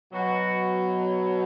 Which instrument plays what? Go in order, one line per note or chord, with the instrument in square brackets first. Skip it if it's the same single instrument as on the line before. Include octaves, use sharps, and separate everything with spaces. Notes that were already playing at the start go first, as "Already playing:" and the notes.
[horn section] B2 F#3 F#4